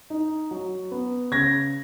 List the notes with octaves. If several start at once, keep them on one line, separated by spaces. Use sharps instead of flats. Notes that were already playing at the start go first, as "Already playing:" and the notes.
D#4
F#3
B3
C#3 G#6 A#6